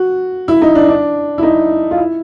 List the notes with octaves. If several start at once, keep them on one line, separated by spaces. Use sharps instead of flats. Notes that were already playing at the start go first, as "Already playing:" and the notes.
Already playing: F#4
E4
D#4
D4
D4
E4
D#4
F4
E4